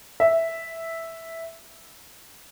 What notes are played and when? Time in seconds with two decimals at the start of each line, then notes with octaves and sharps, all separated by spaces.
0.20 E5